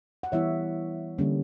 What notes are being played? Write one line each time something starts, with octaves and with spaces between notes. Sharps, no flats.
F#5
E3 G3 B3 E4 C#5 E5
D3 G3 A#3 C#4